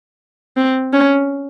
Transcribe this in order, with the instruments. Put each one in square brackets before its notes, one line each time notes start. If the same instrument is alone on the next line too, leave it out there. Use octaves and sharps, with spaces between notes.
[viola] C4
C#4